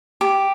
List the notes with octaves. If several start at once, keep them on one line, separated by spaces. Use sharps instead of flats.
G4